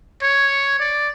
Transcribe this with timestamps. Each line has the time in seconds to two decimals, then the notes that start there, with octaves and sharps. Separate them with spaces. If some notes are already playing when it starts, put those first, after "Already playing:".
0.22 C#5
0.80 D5